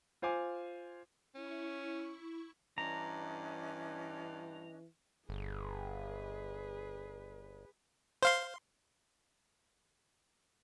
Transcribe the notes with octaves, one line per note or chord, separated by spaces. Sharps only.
F4 C5 F5 G#5 D6
C#4 E4 C#6
G2 E3 C#4 D4 D#5 A#5
G1 G#4 B4
C5 F5 C6